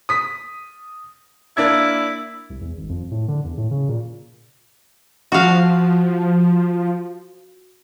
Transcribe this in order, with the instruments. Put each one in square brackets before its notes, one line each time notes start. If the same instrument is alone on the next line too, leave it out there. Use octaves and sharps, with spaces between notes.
[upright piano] D#6 B6
[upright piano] A#3 D4 G#6 [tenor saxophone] E4
[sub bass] C2
E2
G#1
F2
A2
D3
E2
A2
C#3
A#2
[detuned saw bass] F3 [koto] F#4 F5